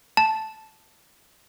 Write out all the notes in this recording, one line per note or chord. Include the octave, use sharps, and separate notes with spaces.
A5